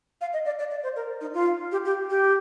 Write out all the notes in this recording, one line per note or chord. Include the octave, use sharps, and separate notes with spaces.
F5
D#5
D5
D5
D5
C5
A#4
D#4
F4
G4
G4
G4